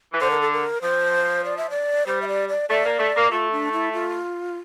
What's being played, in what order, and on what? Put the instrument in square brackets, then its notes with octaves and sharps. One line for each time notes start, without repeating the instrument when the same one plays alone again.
[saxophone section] E3
[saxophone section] D3 [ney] C5
[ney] A#4
A4
A#4
[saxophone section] F3 [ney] C5
[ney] D5
E5
D5
[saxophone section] G3 [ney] C5
[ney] E5
D5
D5
[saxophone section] A3 [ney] D5
[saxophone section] A#3
A3
A#3
[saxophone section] A3 [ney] F4
[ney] D4
E4
F4